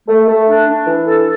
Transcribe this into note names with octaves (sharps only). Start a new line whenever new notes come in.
A3
A3
D4
D4
E3
A4